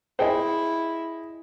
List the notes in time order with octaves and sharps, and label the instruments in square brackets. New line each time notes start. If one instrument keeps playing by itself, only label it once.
[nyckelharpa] E4 [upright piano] G#4 D#5 [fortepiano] C5 G5 G#5